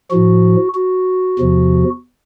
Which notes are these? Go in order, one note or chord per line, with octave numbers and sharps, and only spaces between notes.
A2 F3 F#4
F#4
E2 C3 F3